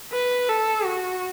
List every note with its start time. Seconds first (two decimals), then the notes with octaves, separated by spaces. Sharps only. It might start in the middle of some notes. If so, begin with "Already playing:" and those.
0.12 B4
0.49 A4
0.85 F#4